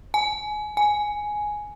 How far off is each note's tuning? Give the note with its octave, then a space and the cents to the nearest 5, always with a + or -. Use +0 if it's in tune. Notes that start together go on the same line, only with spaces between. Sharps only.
G#5 +25
G#5 +5